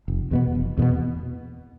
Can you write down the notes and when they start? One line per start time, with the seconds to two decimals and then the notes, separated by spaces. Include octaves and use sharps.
0.08 F1
0.31 E2 B2 B3
0.55 F1
0.77 E2 B2 B3